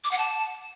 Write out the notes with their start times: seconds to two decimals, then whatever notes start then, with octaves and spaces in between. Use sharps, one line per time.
0.04 D6
0.11 F#5
0.18 A5